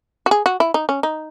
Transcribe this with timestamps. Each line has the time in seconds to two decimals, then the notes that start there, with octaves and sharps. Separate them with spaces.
0.26 F#4
0.31 G#4
0.46 F#4
0.60 E4
0.74 D#4
0.89 C#4
1.03 D#4